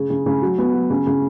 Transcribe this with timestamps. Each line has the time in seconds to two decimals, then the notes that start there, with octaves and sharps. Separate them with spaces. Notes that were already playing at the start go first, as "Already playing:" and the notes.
Already playing: C#3 G#4
0.10 C#3
0.26 C#3
0.42 F#3
0.58 B3
0.74 F#3
0.90 C#3
1.07 C#3